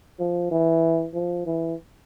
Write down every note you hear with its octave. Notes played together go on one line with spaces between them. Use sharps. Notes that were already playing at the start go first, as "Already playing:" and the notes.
F3
E3
F3
E3